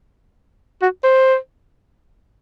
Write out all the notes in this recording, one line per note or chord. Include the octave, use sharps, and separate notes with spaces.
F#4
C5